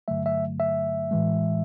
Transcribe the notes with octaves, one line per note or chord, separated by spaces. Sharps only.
G2 D3 F#3 A3 E5
E5
E5
A2 E3 G#3